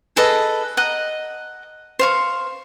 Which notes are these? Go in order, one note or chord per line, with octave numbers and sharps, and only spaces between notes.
G#4 A4 B4 D#5
D#5 F#5 A#5
C5 F5 C#6